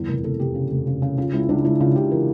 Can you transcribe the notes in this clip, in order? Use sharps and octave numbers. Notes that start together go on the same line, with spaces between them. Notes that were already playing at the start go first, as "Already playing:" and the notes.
Already playing: G1 E2
F1 A#4
F1 A4
F1 G4
C#3
F1
C#3
C#3
C#3 F4
C#2 E4
C#2 D4
C#2 E4
C#3 F4
C#3 G4
E3 A#4